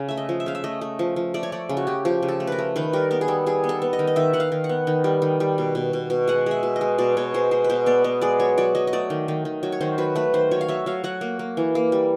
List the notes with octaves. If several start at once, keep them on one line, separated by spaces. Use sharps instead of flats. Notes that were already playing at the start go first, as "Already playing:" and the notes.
Already playing: C#3
A3 E5
D#5
F3
E5
C#3 F5
E5
A3 D#5
A3
F3
F3
A3 D5
C#5
A3 D5
C#3
F#4
C#3 G4
F3 G4
C#3
A4
A3
A#4 B4
A3
D#3 B4
G3 A#4
B3 A#4
G#4
G3 A4
G3 G#4
B3
A4
B3
D#5
D#3
D#5
D#3 E5
D#3 F#5
F5
D#3
F#5
B3
D#3
G3
D#3
G3
B2
B2
B2
B2
G#3 F#5
G#3 E5
B2
D#5
G#3
B2 D5
B2 C#5
G#3 C5
G#3 C5
B4
B2 C5
B3 D5
B3 D#5
G#3 D5
F#3 C#5
F#3 D5
F#3 D#5
D#5
A3 D5
D#3
D#3
D#3
F#3
C#5
D#3 C5
F#3 B4
A3 B4
D#3 C5
F#3 C#5
F5
F#3 E5
F#3 F5
F#3 F#5
A#3
A#3
E3
A#3
G3